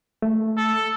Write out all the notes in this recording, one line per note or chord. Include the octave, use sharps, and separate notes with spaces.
A3
A4